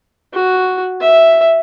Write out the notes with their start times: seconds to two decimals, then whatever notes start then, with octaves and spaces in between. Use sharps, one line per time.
0.34 F#4
1.01 E5